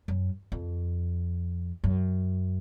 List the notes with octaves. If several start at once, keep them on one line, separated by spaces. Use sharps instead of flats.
F#2
F2
F#2